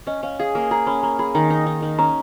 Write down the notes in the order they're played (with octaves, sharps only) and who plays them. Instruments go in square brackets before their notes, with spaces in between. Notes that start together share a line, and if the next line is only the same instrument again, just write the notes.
[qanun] C#4 [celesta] D#5
[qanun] C#4 [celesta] F5
[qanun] G#4 [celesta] F5
[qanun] A#3
[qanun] G#4 [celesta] A#5
[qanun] C#4 [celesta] B5
[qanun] A#3 [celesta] A#5
[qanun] G#4 [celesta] B5
[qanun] D#3 [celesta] A#5
[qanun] D#4
D#4
D#3
[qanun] C#4 [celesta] A#5